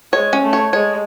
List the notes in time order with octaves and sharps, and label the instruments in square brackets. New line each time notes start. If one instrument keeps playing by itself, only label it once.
[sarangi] G#3 [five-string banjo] C#5
[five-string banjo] C#4
[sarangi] A3
[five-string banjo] C#5
[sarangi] G#3 [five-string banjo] C#5